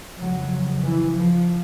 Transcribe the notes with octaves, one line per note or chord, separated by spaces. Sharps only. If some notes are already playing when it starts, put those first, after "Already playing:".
F2 C#3 F#3
E3
F3